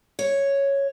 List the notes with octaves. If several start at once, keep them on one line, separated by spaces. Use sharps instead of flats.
C#5